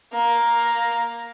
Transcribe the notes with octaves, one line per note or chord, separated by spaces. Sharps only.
A#3